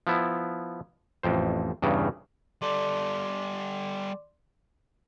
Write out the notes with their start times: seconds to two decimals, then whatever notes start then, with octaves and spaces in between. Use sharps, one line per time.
0.07 F3 B3 E4
1.23 A1 F2 C5
1.82 E2 G2 C#3
2.62 G3 A4 D5 C6 D6